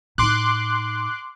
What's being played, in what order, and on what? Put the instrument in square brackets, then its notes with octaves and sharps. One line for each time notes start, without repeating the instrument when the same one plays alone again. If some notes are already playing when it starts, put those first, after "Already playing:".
[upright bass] A2 D#4 [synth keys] C6 D6 F#6